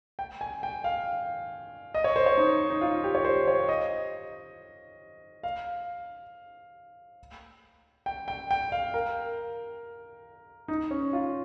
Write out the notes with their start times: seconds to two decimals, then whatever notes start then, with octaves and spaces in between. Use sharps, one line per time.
0.19 G5
0.41 G#5
0.63 G5
0.84 F5
1.94 D#5
2.04 C#5
2.16 C5
2.26 C#5
2.38 D#4
2.70 D#4
2.81 F4
3.04 G4
3.15 C#5
3.25 C5
3.47 C#5
3.69 D#5
5.43 F5
8.06 G5
8.28 G5
8.51 G5
8.72 F5
8.94 A#4
10.68 D#4
10.91 C#4
11.13 F4